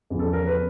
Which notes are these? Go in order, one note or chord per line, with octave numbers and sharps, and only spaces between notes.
E2 C#3 F3
A4
A#4
B4